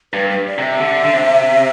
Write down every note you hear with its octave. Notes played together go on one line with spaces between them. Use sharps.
G2 B4
B4
D5
C3 E5
D3
D3
C3